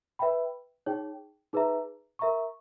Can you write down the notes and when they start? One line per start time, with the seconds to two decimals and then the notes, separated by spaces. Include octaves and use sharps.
0.19 B4 E5 G5 B5
0.86 D#4 G#4 C#5 G5
1.53 D#4 G#4 B4 E5 A#5
2.19 A#4 E5 A#5 C#6